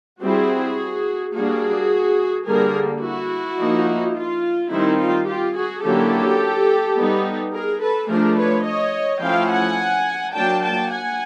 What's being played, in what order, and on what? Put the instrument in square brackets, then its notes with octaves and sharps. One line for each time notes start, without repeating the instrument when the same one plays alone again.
[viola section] G3 C4 E4 F#4 G#4
G3 A#3 D4 F#4 G#4
D3 G3 A#3 G#4 A#4
E4 F#4
F3 A#3 D#4
F4
D#3 G3 C4 D#4 E4
F4
F4 G4
F#4 G#4
D3 F#3 A#3 C#4 E4 G4 A4
G3 B3 D#4
G#4 A#4
A4 B4
F3 A3 D4 G#4 A#4
B4 C#5
C#5 D#5
F3 A3 C#4 E4 F5 G5
F#5 G#5
F#3 A#3 D4 G5 A5
G5 A5
F#5 G#5